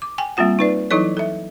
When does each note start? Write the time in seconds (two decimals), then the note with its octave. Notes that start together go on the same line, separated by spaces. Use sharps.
0.02 D6
0.18 G5 G#5
0.37 G3 A#3 C4 F4 F#5
0.59 D#4 B4 D5
0.91 E3 F#3 D#4 E4 A4 C#5
1.17 A4 E5